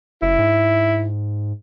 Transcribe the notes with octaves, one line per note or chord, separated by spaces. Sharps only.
F#1 E4
G#2